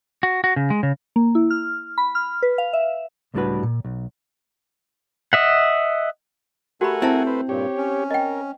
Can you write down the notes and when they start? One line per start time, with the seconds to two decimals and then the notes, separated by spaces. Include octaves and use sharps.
0.23 F#4
0.44 F#4
0.56 C#3
0.70 G#3
0.83 C#3
1.16 A#3
1.35 E4
1.51 F6
1.98 B5
2.15 F6
2.43 B4
2.58 F5
2.73 E5
3.34 C#2 A2 G3 D4 F#4 B4
3.63 A#2
3.85 B1
5.33 D#5 E5 F#5
6.81 A3 F#4 G4 A4 A#4 F#5 G#5 B5
7.02 C4 E4 E5 A5
7.27 B4 C5
7.49 G2 A#2 G4 C#5
7.77 C#4
8.10 A#4 D#5 G5